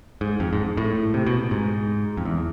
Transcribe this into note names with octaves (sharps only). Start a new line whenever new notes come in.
G#2
F2
G#2
A2
C3
B2
G#2
F2
E2